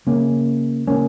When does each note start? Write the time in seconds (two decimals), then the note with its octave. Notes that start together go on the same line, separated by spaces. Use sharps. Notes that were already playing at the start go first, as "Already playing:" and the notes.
0.07 C#3 A#3 C#4
0.87 C#3 A#3 C#4